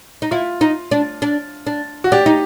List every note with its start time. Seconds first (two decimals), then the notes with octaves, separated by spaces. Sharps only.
0.22 D#4
0.31 E4 F4
0.61 D#4
0.91 D4
1.22 D4
1.67 D4
2.04 F#4
2.12 D4 G4
2.26 D#4